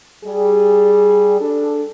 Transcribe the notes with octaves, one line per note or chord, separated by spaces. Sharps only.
G3 G#4
D4 A4